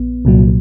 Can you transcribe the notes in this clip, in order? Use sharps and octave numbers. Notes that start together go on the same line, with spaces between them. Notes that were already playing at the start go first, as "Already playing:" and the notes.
Already playing: A#1 B3
C2 A#2 F#3